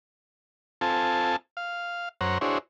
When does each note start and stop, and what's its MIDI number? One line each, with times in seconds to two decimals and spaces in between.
0.81 1.36 60
0.81 1.36 65
0.81 1.36 69
0.81 1.36 80
0.81 1.36 81
1.57 2.09 77
2.21 2.38 42
2.21 2.38 72
2.21 2.38 73
2.21 2.38 78
2.21 2.38 82
2.41 2.58 62
2.41 2.58 64
2.41 2.58 66
2.41 2.58 68
2.41 2.58 72
2.41 2.58 73